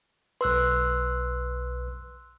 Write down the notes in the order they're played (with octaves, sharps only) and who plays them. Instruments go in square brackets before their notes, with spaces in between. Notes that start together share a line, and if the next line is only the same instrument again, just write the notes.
[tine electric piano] B1 B4 [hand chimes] C6 E6 F#6